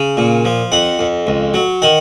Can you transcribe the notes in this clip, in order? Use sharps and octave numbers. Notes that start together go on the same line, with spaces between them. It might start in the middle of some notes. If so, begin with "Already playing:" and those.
Already playing: C#3
A#2
F3
F2 F#5
F2
C#2
F#3
D#3 F#5